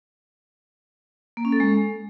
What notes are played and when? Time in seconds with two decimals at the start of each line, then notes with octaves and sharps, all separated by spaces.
1.37 A#3
1.45 C#4
1.52 A4
1.60 G#3